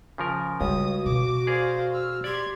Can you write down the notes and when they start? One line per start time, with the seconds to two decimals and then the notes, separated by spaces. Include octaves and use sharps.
0.18 C#3 F3 A#4
0.61 C#2 G3 F#4 D#6
1.06 B2 D6
1.47 G#4 A#4 C5 D5 F5
1.93 E6 F6
2.24 G4 D5 C6 G#6